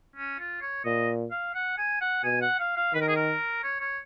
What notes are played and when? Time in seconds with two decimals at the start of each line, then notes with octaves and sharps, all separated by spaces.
0.16 C#4
0.39 F4
0.62 C#5
0.85 A#2 D#5
1.31 F5
1.54 F#5
1.78 G#5
2.01 F#5
2.24 B2 G#5
2.42 F#5
2.59 F5
2.77 F5
2.94 D#3 B4
3.01 A#4
3.08 G#4
3.16 A#4
3.63 C#5
3.80 C#5